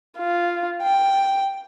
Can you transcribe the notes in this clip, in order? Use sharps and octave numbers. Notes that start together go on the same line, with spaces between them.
F4
G5